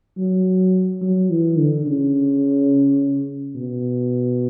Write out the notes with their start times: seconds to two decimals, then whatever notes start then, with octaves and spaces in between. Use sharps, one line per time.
0.18 F#3
1.02 F#3
1.30 E3
1.58 D3
1.86 C#3
3.55 B2